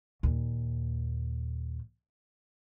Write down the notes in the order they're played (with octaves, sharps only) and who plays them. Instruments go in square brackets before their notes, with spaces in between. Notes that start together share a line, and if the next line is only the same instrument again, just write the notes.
[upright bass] D#2 A#2